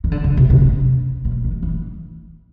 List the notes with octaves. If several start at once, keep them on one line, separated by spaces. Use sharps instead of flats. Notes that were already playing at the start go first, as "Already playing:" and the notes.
D#3
D3
C#3
C3
C#3
C3
A#2
D#3
E3